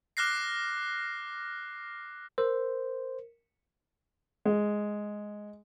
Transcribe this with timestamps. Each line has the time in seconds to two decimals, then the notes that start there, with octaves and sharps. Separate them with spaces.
0.17 D6 F6 F#6 A#6 C7
2.38 A#4 C5
4.46 G#3